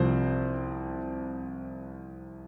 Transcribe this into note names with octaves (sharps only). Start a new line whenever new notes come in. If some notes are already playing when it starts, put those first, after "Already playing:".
Already playing: C2 C3 F3 C4 C5